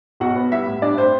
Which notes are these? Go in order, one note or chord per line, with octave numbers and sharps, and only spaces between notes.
B1 F#4 F#5
B3
G3 E4 E5
A2
G2 D4 D5
C4 C5